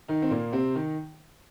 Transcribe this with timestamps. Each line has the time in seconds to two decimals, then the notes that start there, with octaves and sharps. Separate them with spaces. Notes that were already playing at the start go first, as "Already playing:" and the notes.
0.08 D#3 D#4
0.22 C4
0.31 A#2 A#3
0.52 C3 C4
0.75 D#3 D#4